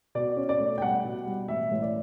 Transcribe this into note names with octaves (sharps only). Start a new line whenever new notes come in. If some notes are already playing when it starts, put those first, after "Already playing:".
B2 D5
C#4
D5
A3
G5
G3 F#5
B2
G3
A1 E5
A1
D5